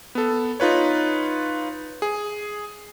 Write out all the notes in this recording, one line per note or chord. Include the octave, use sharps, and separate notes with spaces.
B3 A4
D#4 F4 B4 C#5
G#4